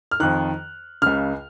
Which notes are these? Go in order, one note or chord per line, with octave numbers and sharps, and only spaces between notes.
F6
F2 D#3 F#6
C#2 C#3 F6